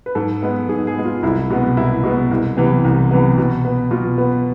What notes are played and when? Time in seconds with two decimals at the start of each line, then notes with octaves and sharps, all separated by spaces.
0.06 B4
0.15 G#2 A4
0.43 G#3 B3
0.69 G#2 G#4
0.87 G#4
0.96 G#3 B3
1.05 F4
1.23 C2 E4
1.50 B2 G#3 B3
1.77 C2 E4
2.03 B2 G#3 B3
2.31 C2
2.57 C3 E3 B3
2.84 C2
3.11 C3 E3 B3
3.38 B2
3.65 B3
3.91 B2 F4
4.18 B3